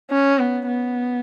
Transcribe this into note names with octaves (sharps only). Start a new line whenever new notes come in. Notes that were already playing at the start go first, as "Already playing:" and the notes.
C#4
B3
B3